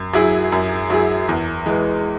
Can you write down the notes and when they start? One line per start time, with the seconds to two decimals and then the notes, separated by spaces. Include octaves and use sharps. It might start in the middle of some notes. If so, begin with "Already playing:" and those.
Already playing: F#2
0.13 F#3 E4 G#4
0.52 F#2
0.90 F#3 E4 G#4
1.29 E2
1.66 E3 G#3